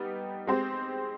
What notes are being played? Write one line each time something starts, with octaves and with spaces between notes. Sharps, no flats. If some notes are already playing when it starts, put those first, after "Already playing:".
Already playing: G3 B3 D#4 G4
G#3 C4 G4 C5